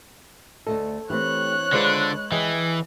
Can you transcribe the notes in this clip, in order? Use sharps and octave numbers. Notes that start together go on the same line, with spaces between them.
D2 A3 A4 D#5
E3 A3 C4 E4 G4 C#5 F#6
D3 G#3 D4 F4 B4 C5 D5
E3 G#4 D#5 G5